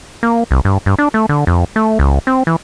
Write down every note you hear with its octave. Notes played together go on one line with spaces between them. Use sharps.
A#3
C2
G2
G2
D4
A3
D3
F2
A3
C#2
C4
E3